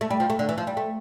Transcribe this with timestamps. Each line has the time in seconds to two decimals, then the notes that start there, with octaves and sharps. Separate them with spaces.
0.01 A3
0.11 G3
0.20 F3
0.30 A3
0.39 D3
0.49 E3
0.58 F3
0.67 G3
0.77 A3